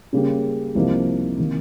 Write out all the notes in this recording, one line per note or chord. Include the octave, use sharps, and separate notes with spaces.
C#3 G3 A#3 C#4 G4
C2 C3 F3 A#3 D#4
C3 D#3 A#3